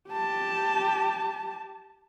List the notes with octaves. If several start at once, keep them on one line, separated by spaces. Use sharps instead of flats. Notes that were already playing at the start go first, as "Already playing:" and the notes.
G4 A5